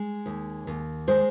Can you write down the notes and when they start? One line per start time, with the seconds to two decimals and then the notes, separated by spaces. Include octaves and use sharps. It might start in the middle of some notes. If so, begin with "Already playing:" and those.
Already playing: G#3
0.26 D#2
0.67 D#2
1.08 G#3 C5